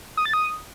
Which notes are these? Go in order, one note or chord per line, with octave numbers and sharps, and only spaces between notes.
D#6
A6
D#6